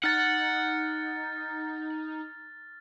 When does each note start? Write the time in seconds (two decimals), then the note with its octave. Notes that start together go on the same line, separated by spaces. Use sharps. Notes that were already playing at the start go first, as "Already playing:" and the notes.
0.03 D#4 F#5 F6 A6